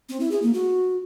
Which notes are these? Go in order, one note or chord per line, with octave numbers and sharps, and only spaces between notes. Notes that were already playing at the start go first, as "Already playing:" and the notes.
C4
E4
G#4
A#3
F#4